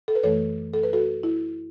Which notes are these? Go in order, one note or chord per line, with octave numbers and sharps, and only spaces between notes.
A4
B4
F#2 E3 A3 A4 C#5
A4
B4
F#4 A4
E4